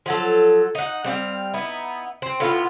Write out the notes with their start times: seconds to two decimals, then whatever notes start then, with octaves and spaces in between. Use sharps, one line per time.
0.06 F3 F#3 A4
0.75 D#4 F#5
1.04 G3 C4 F5
1.54 B3 D#4 E4
2.22 C4
2.40 A2 B3 F4